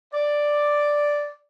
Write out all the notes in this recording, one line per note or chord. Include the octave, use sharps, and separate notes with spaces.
D5